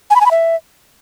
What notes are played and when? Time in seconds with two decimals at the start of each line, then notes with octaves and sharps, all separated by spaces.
0.10 G#5
0.16 B5
0.21 G#5
0.26 B5
0.31 E5